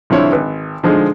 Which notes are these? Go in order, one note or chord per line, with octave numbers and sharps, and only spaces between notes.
C2 D3 F3 E4 C#5
G#1 B4
D3 F3 G#3 D#4